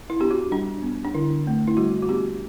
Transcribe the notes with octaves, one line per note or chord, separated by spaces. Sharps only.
E4
B3 D4 G4
F#4
G3 D4
B3 D4
D4
D3 E4
A3 C4
E4
G3 F#4
F#4
B3 D4 G4